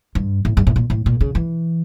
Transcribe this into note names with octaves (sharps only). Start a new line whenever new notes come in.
G2
A2
G2
A2
A#2
A2
A#2
C#3
E3